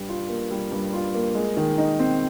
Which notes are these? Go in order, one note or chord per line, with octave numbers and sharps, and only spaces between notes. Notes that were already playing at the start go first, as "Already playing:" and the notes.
Already playing: G2 G3
F4
A#3
G3
G2
F4
A#3
G#3
D#3
D#4
C4